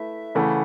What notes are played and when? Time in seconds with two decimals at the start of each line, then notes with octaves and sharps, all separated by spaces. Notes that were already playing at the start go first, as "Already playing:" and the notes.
Already playing: A3 E4 B4 E5
0.35 C#3 E3 A3 F#5